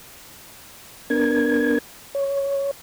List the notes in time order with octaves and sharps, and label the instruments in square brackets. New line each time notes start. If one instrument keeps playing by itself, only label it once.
[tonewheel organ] B3 D4 A#4 G#6
C#5